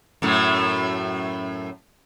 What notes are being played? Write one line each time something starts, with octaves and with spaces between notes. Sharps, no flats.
F#2 A2 A3